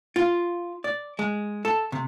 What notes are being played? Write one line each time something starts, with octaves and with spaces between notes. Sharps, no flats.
F4
D5
G#3
A4
C3